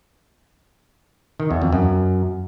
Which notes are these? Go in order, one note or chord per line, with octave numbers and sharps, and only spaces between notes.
D#3
E2
F2
F#2